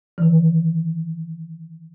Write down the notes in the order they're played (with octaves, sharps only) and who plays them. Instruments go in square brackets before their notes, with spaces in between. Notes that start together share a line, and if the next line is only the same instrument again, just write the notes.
[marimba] D#3 E3